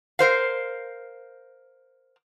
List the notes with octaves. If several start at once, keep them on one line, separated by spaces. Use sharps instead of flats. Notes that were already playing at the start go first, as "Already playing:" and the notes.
A#4 C5 F5